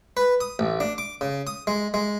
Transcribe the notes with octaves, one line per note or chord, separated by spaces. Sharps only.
B4
D#6
A1
D4
D6
C#3
D#6
G#3
G#3